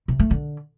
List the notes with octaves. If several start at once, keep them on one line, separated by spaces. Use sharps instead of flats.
C3
A3
D3